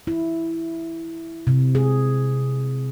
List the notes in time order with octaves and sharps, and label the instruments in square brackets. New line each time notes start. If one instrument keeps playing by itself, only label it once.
[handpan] E4
C3
G#4